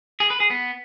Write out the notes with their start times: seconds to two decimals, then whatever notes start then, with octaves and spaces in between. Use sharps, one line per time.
0.20 G#4
0.30 B4
0.40 G#4
0.50 B3